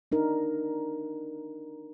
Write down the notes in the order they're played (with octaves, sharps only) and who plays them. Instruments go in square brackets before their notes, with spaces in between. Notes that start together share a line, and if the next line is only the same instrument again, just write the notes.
[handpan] D4 D#4 A#4